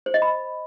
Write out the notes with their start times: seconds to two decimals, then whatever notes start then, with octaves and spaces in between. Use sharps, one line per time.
0.06 C5
0.14 D#5
0.22 B5